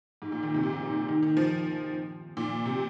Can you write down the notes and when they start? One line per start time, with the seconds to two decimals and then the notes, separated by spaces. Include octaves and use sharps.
0.22 G#2
0.32 A#2
0.43 D#3
0.54 C3
0.63 A#2
0.73 G#2
0.82 A#2
1.08 D#3
1.22 D#3
1.37 F3
2.37 A#2
2.65 C3